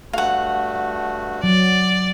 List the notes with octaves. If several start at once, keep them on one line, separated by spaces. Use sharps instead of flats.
G2 A3 F#4 F5 F#5
F#3 D5